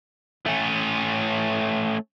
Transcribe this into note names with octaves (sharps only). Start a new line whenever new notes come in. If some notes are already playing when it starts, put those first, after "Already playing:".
A3 C#4